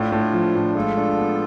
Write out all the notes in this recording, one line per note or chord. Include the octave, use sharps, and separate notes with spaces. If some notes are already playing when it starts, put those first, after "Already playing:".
Already playing: A2 D4 F4
A2
F3
A2
G#3 F4 A4
D4
B3